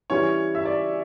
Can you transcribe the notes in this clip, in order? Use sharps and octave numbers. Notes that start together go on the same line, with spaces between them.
E3 G3 C#4 E4 C#5
E5
D5